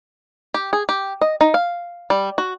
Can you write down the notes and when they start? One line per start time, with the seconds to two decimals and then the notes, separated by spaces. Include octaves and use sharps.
0.54 G4
0.73 G#4
0.89 G4
1.21 D#5
1.41 D#4
1.54 F5
2.10 G3
2.38 F#4